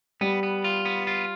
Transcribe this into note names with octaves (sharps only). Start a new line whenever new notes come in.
G3 B3
B3
F4
B3
F4